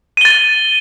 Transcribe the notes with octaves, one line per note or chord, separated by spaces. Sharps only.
A6 D#7 G7